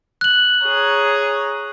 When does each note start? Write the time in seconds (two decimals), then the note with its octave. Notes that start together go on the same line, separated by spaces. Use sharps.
0.21 F#6 F#7
0.64 G#4 C#5 A#5